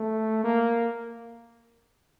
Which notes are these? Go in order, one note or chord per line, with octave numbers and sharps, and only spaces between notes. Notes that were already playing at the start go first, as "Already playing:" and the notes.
Already playing: A3
A#3